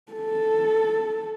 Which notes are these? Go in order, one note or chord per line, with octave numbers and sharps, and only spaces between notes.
A4